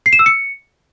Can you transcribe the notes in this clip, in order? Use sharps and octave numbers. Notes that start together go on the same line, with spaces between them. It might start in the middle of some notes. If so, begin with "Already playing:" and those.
C7
E7
E6
C#7